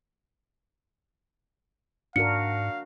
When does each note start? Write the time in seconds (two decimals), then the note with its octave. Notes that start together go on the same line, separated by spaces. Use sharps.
2.16 G#2 D4 F#4 A#4 F5 C#7